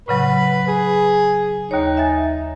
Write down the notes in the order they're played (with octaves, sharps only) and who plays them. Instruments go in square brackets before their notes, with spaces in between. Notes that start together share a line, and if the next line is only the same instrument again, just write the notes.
[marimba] A2 C#3 F#3 [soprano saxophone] B4
[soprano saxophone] G#4
[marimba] D#2 C#5 [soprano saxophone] D#4
[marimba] E5 G#5 A6